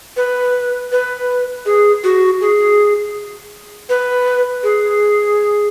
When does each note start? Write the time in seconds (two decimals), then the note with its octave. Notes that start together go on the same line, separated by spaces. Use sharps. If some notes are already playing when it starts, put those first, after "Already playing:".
0.17 B4
0.92 B4
1.66 G#4
2.04 F#4
2.41 G#4
3.89 B4
4.63 G#4